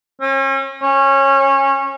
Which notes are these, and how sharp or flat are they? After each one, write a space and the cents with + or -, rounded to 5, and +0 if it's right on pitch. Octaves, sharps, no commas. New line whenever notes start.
C#4 -40
C#4 -20